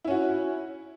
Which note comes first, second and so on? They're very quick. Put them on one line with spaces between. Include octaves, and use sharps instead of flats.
E4 C#4 F#4